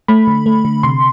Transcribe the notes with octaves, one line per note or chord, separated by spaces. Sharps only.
A3 B5
D3
A3
D3
C3 C6